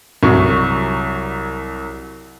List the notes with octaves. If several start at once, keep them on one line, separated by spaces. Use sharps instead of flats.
C2 F#3 C#6